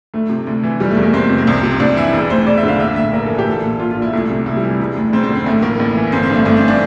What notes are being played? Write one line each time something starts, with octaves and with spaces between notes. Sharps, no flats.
D2 A3
C3
D2
E3
F1 G3
A3
E2
A#3
F1 C4
C3
A#3
C2 C4
C3
C2 D4
E3 E4
E1
D2 C5
E1 D5
E5
D3
F5
A#1 E5
A2 E5
A#1 A#4
E3 A4
G4
A#1
A4
A#2
A#2 F4
F4
A#1
E4
C2 A3
C3 A3
C2 E4
G3
E3
E1
D2
E1 C4
C4
D3
C4
A1 A3
A2 A#3
A1
E3
G1 C4
C4
G2
A3
G1 A3
C4
E3
D4